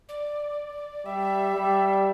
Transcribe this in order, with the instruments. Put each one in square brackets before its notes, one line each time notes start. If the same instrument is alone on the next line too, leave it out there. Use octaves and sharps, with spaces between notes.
[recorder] D5
[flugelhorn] G3 [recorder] E5
[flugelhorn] G3